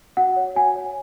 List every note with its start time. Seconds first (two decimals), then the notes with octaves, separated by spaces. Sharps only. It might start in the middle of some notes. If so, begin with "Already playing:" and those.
0.17 F#4 F#5
0.36 C#5
0.56 F#4 G#5
0.76 C#5